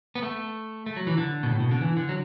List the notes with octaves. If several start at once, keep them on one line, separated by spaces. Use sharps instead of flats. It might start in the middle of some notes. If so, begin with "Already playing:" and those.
B3
A3
A3
F#3
E3
D3
B2
A2
B2
D3
E3
D3
F#3